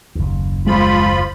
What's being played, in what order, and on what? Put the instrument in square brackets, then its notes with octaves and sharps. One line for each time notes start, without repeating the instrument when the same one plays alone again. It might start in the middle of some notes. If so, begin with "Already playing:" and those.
[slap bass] F#1 D#2
[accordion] F3 F4 B5 [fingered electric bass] G#3